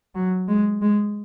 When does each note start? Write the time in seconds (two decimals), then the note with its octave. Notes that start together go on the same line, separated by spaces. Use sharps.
0.15 F#3
0.48 G#3
0.82 G#3